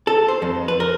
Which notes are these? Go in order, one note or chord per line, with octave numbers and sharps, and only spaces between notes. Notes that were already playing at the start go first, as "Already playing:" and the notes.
A4
C5
F2
B4
A#4